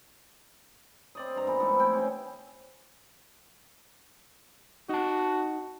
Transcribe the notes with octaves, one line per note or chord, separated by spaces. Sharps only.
C4 D5 D#5
G2 A#5
A#2 E3 B3
G#2 E3 F3 A3
C4 E4 G5
C3 E3 C#4
D#4 F#4 A5